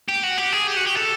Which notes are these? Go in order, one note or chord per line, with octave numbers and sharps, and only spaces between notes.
G4
F#4
G4
G#4
G4
F#4
G4
A4